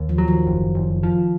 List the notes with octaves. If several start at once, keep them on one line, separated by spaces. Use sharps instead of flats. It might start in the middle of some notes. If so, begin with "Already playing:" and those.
Already playing: D#2
F3
F#3
D#3
F#1
F#1
F3